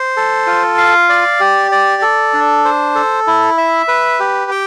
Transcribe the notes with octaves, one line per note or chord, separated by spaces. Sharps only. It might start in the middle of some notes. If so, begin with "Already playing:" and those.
Already playing: C5
A4
F4
F5
D5
G4
D5
A4
D4
C5
A4
E4
E5
B4
G4
G5